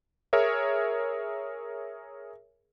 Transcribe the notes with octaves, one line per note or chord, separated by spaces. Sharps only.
G#4 A#4 C#5 E5